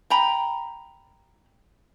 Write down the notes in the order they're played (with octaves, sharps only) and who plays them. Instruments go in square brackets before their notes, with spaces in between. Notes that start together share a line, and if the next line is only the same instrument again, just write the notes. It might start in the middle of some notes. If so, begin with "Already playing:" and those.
[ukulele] G5 A#5 B5